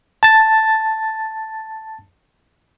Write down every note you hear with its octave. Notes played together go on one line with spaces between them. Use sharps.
A5 A6